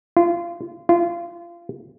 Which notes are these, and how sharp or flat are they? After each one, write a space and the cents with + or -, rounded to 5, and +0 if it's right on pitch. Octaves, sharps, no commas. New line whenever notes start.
F4 -25
F4 -25